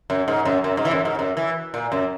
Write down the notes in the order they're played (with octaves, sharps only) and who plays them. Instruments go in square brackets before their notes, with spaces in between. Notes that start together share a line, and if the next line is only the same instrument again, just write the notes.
[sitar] F#2
G#2
F#2
F#2
G#2
E3
F#2
G#2
F#2
E3
A#2
F#2